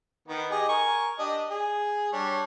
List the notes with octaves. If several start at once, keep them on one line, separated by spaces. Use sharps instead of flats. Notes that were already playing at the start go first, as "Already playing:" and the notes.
D#3 B3
G4 G#4 D#5
A#4 G#5 C#6
D4 G4 D#5
G#4
G3 D4 C#5